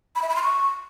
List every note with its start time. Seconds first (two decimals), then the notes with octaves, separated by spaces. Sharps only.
0.15 B5
0.22 E5
0.29 B5
0.36 C6
0.42 C#6